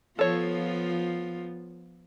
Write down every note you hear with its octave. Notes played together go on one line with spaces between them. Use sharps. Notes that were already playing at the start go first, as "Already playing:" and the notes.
F3 B3 F4 A4 C#5